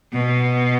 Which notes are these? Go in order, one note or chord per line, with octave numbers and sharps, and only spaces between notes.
B2